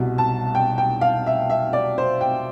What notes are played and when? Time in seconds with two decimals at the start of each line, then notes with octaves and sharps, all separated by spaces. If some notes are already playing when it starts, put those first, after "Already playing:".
Already playing: C2 B2 G3
0.18 A5
0.55 G5
0.78 G5
1.01 F5
1.26 E5
1.50 E5
1.73 D5
1.98 C5
2.21 G5